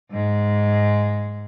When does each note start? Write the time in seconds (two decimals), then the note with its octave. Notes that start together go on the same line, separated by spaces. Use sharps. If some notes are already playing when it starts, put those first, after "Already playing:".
0.11 G#2 G#3